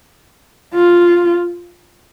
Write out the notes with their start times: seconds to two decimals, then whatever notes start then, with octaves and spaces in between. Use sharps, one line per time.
0.74 F4